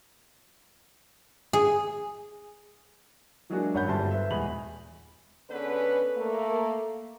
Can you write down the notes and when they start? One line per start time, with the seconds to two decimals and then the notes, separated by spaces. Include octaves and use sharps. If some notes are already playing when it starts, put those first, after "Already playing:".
1.53 G#4
3.50 E3 F#3 G#3 A#3 D4 F#4
3.74 G#1 F#2 C#5 F#5 B5 G6
3.88 G1 G3 C5 E5 A5 C6
4.11 B4 E5
4.31 D#1 E2 G#3 B5 F#7
5.50 D3 B3 C#4 G#4 B4
6.17 A3 A#3